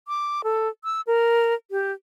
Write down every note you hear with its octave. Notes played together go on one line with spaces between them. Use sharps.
D6
A4
E6
A#4
G4